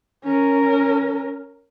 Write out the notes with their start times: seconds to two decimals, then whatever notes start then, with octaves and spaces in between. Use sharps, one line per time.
0.24 C#4 A#4